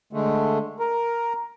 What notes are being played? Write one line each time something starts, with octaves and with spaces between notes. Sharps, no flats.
D3 G#3 A3
A#4